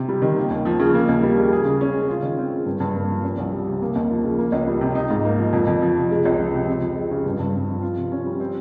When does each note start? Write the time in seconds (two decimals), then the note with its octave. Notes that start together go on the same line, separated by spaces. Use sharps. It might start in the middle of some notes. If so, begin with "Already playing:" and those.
Already playing: C3
0.08 G3
0.22 D#3
0.37 A#3
0.51 D#2
0.65 F3
0.80 C#3
0.94 A#3
1.09 D#2
1.23 G3
1.37 C#3
1.52 G#4
1.65 C#3
1.81 C#4
1.95 G#3
2.10 F4
2.23 D#3
2.38 C4
2.52 G#3
2.66 G2
2.80 G2
2.96 A#3
3.09 F3
3.23 C#4
3.38 C2
3.53 G3
3.67 C3
3.82 A#3
3.95 D#2
4.10 F3
4.24 C#3
4.38 A#3
4.52 C#2
4.68 G3
4.81 C3
4.95 D#4
5.10 G#2
5.25 A#3
5.38 F3
5.53 F2
5.67 F2
5.82 F3
5.96 C3
6.11 G#3
6.25 C#2
6.40 F3
6.54 C3
6.68 C4
6.82 F2
6.96 G#3
7.11 C#3
7.26 G2
7.39 G2
7.54 C4
7.69 F3
7.82 F4
7.97 C3
8.12 C#4
8.26 G3
8.40 C4